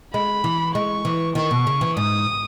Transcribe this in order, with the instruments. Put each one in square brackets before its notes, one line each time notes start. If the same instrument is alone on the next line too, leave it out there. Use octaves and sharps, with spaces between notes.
[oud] G#3 [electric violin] B5
[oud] E3
[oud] G#3 [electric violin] C#6
[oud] E3
[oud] D#3 [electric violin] C#6
[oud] B2
C#3
E3
[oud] G#2 [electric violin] D#6